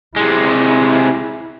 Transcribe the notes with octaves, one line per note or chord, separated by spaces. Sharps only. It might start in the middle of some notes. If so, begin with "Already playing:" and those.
C3 G#3 E4